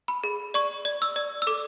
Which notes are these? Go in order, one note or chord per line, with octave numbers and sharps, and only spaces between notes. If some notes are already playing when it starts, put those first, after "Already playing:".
B5
G#4
D5 C#6
D5
E6
D5
E6
A4 D6